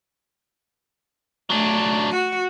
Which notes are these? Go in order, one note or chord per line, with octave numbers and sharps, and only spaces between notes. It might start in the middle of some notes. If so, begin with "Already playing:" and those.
F#3 A3 D4
F#4